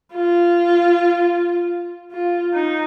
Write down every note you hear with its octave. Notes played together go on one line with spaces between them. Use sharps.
F4
F4
D#4